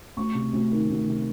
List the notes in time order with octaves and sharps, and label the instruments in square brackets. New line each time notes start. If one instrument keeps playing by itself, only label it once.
[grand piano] D2 C#6
C3
D2
D#3
D2
C3